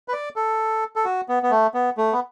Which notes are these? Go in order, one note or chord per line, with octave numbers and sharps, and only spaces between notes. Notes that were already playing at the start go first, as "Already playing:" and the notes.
B4
D5
A4
A4
F#4
B3
B3
A3
B3
A3
B3